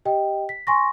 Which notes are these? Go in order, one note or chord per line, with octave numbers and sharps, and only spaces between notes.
G4 D#5 G5
B6
G#5 C6 C#6 A#6